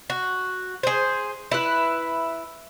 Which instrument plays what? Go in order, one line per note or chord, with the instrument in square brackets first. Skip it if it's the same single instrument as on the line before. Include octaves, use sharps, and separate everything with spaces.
[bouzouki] F#4
G#4 C5
E4 B4